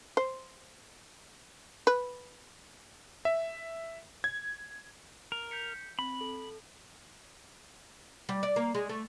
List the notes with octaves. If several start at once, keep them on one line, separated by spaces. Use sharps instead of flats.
C5
B4
E5
G#6
A#4
G6 B6 C#7
C4 B5
A4
G3
D5
A#3
G#3
A3